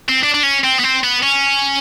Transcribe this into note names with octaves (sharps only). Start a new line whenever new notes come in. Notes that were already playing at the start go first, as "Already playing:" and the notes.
C4
D4
D4
C#4
C4
B3
C4
B3
C#4